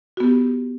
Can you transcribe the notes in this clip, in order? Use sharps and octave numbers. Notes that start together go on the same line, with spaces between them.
B3 F#4 G4